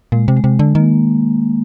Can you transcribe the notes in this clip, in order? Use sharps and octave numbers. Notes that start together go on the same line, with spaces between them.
A#2 G#3
C3
G#3
C3
D3
D#3 A#3